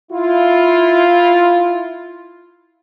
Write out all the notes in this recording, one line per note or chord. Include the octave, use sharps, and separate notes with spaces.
E4 F4